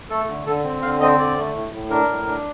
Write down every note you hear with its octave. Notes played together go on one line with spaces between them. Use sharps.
A3 A4
D3
D3 A4
C4
D3 F5
C4 D#5
D3 D5
A3
A2
A2
D4 A#4
A2
D4